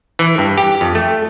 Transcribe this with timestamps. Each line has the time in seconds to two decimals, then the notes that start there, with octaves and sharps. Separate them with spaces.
0.19 E3
0.38 G2
0.58 G4
0.81 F2
0.95 A3